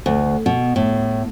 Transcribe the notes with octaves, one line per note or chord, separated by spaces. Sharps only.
D2
B2
A2